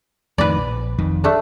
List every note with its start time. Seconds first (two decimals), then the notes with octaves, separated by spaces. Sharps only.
0.38 F2 A2 D#3 B4 D5
0.57 A#1
0.99 F1 F2 D#3
1.24 A3 D4